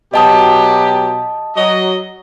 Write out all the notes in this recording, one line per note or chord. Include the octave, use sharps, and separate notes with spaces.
B2 F#3 G4 D#5 A5 D#6
F#3 D#5